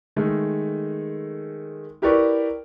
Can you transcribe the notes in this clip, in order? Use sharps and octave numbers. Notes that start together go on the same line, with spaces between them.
D#3 G#3 A3
E4 G4 A#4 B4 D5 C#6